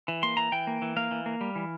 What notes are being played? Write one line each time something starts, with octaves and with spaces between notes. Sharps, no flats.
E3
A#3 C6
E3 A#5
E3 G5
A#3
E3
A#3 F5
E3
A#3
G3
E3